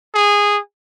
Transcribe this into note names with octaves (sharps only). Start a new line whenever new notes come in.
G#4